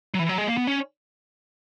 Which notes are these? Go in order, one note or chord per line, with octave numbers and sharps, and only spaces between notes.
F#3
E3
F#3
G#3
A#3
B3
C#4